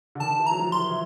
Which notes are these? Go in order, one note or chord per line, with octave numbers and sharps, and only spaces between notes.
D3
D#3 A5
E3
F#3 A#5
F3
C6
E3
E3